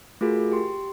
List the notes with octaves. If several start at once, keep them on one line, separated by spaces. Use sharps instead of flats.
A3 F4 F#4 G#4 A#4
G4 C6